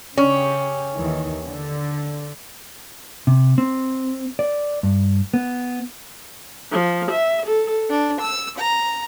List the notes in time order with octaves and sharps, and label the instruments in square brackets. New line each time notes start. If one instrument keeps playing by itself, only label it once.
[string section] C#3 G4 [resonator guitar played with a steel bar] C#4
[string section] D#2 D#3 E3
D3
[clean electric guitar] C3
C4
D5
G2
B3
[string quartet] F3
E5
A4
D4
E6
A#5